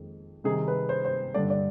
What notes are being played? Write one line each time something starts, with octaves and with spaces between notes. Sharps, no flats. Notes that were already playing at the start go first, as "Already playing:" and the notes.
Already playing: F2 D#3 G#3 C4
C3 D#3 G3 C4 D#4 G#4
B4
C5
C5
G2 D3 G3 D4 D5
D5